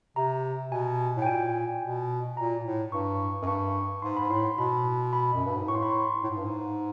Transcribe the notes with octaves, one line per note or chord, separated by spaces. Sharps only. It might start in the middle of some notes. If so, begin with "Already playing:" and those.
C3 A#5
B2 G#5
A2
G5
A#2 G#5
B2
A#2 A#5
A2
G2 C#6
F#2
G2 C#6
G#2 C6
G#2 B5
A2 C6
B2 B5
B5
F#2
G2
G#2
A2 C#6
C6
B5
C6
A2
G#2
G2
G#2